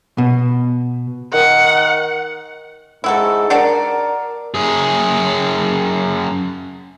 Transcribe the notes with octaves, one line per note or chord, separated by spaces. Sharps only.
B2
D#3 F#5
G#2 E4 F#4 A4
D4 F#4 A#4 D5
F#2 G#4